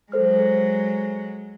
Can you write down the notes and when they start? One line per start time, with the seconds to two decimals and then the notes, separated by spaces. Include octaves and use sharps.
0.12 F#3 G#3 A4 C5 F6